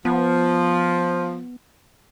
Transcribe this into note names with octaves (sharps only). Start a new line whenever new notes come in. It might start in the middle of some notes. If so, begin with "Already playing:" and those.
F3 B3